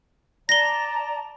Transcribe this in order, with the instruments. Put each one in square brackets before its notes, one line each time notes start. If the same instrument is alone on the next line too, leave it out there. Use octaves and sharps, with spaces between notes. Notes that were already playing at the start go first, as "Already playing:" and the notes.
[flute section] D5 A5 A#5 [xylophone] A#6 G7